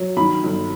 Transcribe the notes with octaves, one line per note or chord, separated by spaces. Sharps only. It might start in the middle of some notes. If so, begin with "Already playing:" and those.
Already playing: F#3
D#3 B5
G1